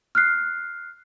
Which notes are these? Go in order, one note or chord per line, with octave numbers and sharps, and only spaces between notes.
F6 F#6 C7